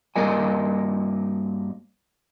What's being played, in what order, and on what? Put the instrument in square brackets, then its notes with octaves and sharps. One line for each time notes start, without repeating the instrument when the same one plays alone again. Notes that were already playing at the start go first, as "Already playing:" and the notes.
[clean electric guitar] G2 A#3 A#4 D#5 G#5